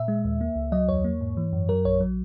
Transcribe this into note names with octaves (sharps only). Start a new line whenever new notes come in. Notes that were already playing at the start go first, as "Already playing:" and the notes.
Already playing: A#2 E5
G#3
D#2
A#3
C#2
F#3 D#5
E2 C#5
A#3
G#2
E3
F#2
F#3 A#4
A#1 C#5
F#3